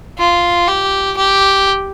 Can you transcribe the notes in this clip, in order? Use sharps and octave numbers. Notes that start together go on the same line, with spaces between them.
F4
G4
G4